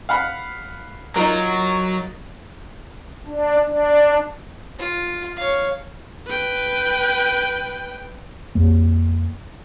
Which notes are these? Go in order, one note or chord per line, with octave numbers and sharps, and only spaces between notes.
F5 F#5 B5
F#3 D#4 F4 A#4
D4
D4
F4
C#5 F5
B4 G5
F2 A#3